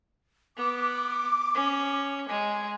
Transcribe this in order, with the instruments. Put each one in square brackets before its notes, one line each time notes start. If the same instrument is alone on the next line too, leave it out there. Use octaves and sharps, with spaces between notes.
[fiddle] B3 [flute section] D6
[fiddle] C#4
G#3 G#5